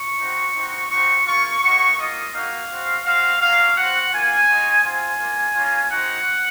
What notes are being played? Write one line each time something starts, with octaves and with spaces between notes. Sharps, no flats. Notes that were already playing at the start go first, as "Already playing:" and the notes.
Already playing: C#6
C4 D#4 F#4
C4 D#4 F#4
C4 D#4 F#4 C#6
A#3 F4 C#6
A#3 D#4 F#4 C#6
A#3 F4 D#5
A#3 D#4 F#4 F5
C4 F#4
C4 F#4 F5
A#3 C#4 F#4 F5
C4 F#4 F#5
A#3 F4 G#5
G#3 D#4 F#4
C4 F4 G#5
A#3 F4
A#3 C#4 F4
C4 D#4 F#4 F#5